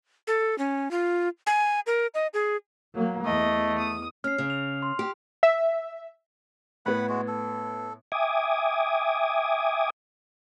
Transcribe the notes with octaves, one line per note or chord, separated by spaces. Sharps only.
A4
C#4
F4
G#5
A#4
D#5
G#4
F#3 A#3
E2 A3 D#5
D#6
C#4 F6 C7
C#3
F7
C6
G4
E5
A2 B3 B4 F#5 B5
G#3 F#4
A4
E5 G5 G#5 D6 D#6 G#6